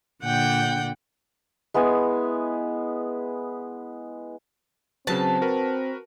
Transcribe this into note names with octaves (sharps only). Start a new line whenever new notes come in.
A#2 D3 F#5 G5 G6
G#3 B3 E4 G#5
C#3 F#3 C4 B4 A5
F#4 A#4 B4